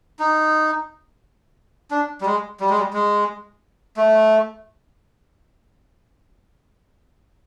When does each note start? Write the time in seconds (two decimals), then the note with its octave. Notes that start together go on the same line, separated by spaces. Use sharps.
0.19 D#4
1.91 D4
2.21 G3
2.26 G#3
2.60 G3
2.70 G#3
2.78 G3
2.93 G#3
3.97 A3